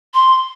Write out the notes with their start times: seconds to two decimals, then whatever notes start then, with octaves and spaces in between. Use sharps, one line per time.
0.14 C6